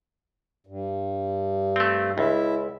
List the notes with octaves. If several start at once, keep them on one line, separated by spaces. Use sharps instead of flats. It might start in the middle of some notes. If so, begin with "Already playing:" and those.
G2
A3 C4
C#2 E4 E5